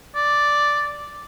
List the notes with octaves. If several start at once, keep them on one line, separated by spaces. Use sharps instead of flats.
D5